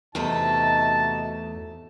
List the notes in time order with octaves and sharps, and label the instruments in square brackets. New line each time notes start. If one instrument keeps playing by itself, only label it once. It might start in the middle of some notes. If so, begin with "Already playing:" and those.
[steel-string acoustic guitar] E2 A3 A4 [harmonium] C3 D#4 F#4 [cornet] A5